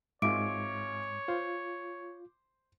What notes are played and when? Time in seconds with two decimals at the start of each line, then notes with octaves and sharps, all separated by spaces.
0.22 G#1 G#2 F4 C#5 E5 D6 D7
1.28 F4 C5